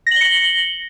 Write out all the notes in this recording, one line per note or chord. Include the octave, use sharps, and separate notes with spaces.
A#6 C#7 F#7 G7